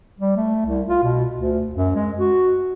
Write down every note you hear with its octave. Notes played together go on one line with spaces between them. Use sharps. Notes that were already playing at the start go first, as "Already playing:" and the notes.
G3
A3
C2
F4
B2
D2
F#2
G#3
F#4